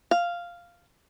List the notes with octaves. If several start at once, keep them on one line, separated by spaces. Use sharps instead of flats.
F5